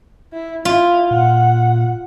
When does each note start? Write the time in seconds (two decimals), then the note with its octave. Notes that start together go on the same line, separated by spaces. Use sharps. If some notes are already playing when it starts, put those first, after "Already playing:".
0.33 E4
0.65 E4 F4
1.11 A#2 F#5